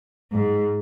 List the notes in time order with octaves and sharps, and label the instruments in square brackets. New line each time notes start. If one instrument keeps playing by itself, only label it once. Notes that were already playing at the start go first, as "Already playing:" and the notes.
[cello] G#2